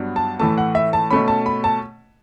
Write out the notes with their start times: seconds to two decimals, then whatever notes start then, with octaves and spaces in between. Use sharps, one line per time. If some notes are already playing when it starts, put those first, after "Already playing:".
Already playing: G2 F#3 B3 D4
0.16 A5
0.40 A2 E3 A3 A5
0.58 F#5
0.75 E5
0.93 A5
1.11 B2 A3 C#4 B5
1.28 A5
1.46 B5
1.64 A5